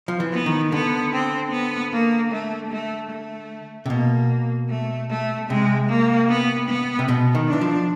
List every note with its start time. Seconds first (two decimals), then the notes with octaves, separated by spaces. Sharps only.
0.08 F3
0.20 E3
0.33 B3
0.46 D#3
0.72 D3 B3
1.12 C4
1.52 B3
1.92 A#3
2.32 A3
2.71 A3
3.11 A3
3.86 C3
3.90 B2 A#3
4.70 A3
5.10 A3
5.49 C3 G#3
5.89 A#3
6.29 B3
6.69 B3
6.99 C3
7.08 B2
7.35 D#3
7.49 E3 D4
7.61 F3